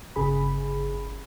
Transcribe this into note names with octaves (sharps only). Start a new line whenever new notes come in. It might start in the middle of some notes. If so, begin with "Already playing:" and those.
G1 C#3 G#4 B5